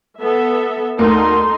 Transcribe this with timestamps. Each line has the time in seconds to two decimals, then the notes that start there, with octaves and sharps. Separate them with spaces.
0.21 B3 A4 E5
0.99 D2 A#3 D#4 A4 C6